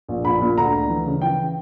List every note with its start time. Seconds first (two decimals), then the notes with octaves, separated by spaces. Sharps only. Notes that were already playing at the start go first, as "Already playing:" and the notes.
0.08 A#1
0.24 A#1 B5
0.41 A#2
0.57 D2 A#5
0.73 D2
0.89 E3
1.06 C#3
1.22 E3 G5